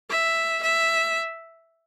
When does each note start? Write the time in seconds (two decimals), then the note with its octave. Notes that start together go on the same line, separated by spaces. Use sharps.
0.10 E5
0.63 E5